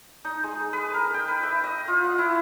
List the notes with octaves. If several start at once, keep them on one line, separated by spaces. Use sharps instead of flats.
D#4
G#3
B4
A#4
G5
B4
E5
D#5
F4
F#5
E4